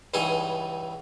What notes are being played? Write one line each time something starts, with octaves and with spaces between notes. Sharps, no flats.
C#2 G2 E3 D#4 G#4